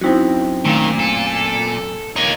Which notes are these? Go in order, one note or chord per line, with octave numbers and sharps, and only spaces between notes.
F#2 C4 D#4 E4 F#4
A#2 D#3 A3 F5
A4
A#3 D#4 C#5 D#5 A#5